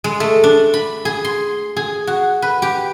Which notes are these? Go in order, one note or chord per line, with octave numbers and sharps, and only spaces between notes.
G#3
A3
D4
B5
G#4
C6
G#4
F#4
B4
G4